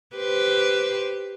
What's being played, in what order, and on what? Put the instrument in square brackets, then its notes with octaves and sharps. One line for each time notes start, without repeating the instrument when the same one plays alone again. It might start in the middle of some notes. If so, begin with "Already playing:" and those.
[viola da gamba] G4 B4 C5